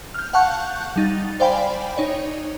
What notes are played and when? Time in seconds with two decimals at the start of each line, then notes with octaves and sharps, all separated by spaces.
0.14 F6 G6
0.33 F5 F#5 A5 C#6 F#6 G6
0.96 G3 D#4 A6
1.40 C5 D5 F5 G5 G#5 B5
1.97 D#4 C#5 D5